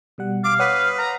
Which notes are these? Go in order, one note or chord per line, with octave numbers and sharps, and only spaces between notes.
B2 G3 F#5
F5 D6
B4 C#5 F#5 D#6
A#5